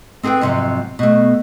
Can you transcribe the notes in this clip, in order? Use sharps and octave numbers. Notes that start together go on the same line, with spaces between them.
C4 G#4 A4 B4 G5
F2 G#2 C3 F3 F#3
B2 A3